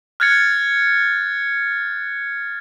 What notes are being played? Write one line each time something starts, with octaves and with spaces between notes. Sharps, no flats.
F6 F#6 G#6 A6 C#7